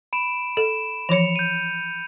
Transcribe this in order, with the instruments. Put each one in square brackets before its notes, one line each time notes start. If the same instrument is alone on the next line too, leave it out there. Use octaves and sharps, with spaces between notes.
[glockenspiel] B5 D7 E7
[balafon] A4 [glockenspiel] E7
[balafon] E3 F3 C#5 [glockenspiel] C#7 F7
[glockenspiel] G6 D#7